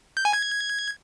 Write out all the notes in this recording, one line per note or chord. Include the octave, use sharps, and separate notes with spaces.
G6
G#5
G#6